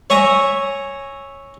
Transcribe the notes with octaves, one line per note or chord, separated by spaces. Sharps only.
C#5 E5 G#5 A#5